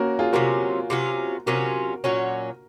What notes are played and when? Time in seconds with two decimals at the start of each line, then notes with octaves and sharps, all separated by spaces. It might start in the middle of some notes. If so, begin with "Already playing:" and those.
Already playing: A#3 C#4 F#4 A#4
0.19 F4 G#4
0.33 C3 F#3 C#4 F4 F#4 A#4
0.90 C3 F#3 C#4 F4
1.46 C3 F#3 C#4 F4 F#4 A#4
2.04 A#2 F#3 C#4